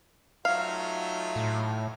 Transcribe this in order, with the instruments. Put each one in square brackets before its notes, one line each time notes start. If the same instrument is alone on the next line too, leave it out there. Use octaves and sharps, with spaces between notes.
[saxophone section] F#3 E5 [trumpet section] A3 D#4 F4 [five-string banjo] F5
[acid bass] A2